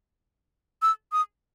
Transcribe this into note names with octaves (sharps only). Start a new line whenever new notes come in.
E6
D#6